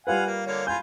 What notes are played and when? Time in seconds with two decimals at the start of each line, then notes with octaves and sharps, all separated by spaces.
0.07 G3 F4 B4 F5 F#5 G#5
0.26 A#3
0.46 D3 A#3 C#5
0.67 F4 G#5 B5 G6